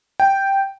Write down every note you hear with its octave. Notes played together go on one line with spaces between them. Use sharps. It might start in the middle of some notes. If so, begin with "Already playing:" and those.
G5